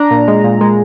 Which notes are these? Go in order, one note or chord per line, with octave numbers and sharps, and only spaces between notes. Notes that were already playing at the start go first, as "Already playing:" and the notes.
Already playing: D4 A#5
A#2
G#3
A#2
G#3